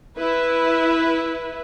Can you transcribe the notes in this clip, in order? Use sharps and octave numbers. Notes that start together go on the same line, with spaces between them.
E4 B4